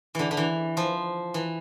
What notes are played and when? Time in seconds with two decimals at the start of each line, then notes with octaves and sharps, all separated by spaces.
0.15 D3 E3
0.31 D3
0.37 E3
0.77 F3
1.34 E3